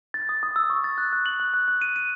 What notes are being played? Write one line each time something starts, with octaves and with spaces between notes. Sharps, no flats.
A6
D#6
D#6
E6
C#6
A6
F#6
F#6
F#7
F#6
F#6
F#6
D#7
D#7